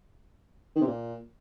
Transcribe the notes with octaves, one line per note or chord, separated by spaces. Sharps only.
D#3
C3
A#2